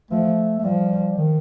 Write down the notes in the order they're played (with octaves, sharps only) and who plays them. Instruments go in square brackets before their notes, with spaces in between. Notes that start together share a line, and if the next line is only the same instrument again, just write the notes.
[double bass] F3 [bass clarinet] A3
[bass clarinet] A3
[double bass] F3 [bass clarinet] G3
[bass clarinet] D#3